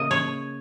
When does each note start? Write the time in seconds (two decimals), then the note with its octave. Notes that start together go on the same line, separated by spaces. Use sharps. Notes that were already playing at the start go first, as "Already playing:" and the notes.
Already playing: C#3 A#3 D#5
0.11 C#5